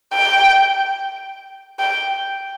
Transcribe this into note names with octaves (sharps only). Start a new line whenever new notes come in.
G5
G5